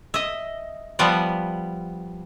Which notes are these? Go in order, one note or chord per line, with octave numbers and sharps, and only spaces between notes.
D#5 E5
F3 G3 B3 B4 D5